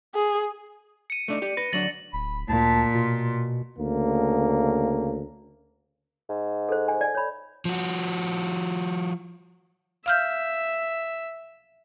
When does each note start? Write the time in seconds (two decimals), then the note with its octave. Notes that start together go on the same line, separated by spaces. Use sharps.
0.15 G#4
1.10 C#7 D#7
1.28 A3 D4 D#4
1.42 G4 D5
1.57 B4 A#6
1.73 D2 F#3 D4 A6 A#6 F#7
2.13 D1 B5
2.49 D2 A#2 A5
2.95 B2 F4
3.79 D2 C#3 A#3
6.29 G#2
6.69 A4 C5
6.88 G#5
7.01 D5 G#5
7.15 C#5 B5
7.65 F3 F#4
10.06 E5 F5 F6 G6